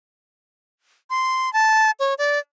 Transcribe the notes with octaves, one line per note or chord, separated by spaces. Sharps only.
C6
A5
C#5
D5